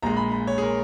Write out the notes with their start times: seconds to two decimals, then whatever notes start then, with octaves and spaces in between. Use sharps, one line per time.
0.02 A#1 A#2 G#3 A#5
0.17 B5
0.32 B5
0.47 C#5
0.58 G#4
0.62 A#4